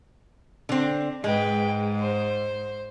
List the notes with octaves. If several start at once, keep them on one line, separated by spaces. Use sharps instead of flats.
D3 C4
G#2 G#3 B4 G5
C5